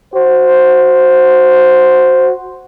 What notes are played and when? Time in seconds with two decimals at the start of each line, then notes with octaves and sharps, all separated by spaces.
0.14 F#4 C5